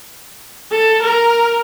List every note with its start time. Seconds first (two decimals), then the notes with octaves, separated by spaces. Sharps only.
0.71 A4
1.03 A#4